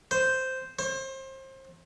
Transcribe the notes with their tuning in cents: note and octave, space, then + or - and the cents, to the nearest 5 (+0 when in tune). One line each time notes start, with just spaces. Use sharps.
C5 -5
C5 +30